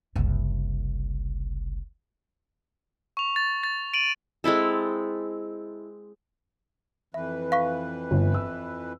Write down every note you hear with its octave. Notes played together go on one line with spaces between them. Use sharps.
F#1 C2
C#6 F7
A6
A6
D7 D#7 F#7
G#3 C4 E4 A4
F2 E3 B4 E5
F5 C#6 B6
G1
E6